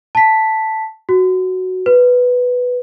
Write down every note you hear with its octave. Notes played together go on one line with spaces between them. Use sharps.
A5 B6
F#4
B4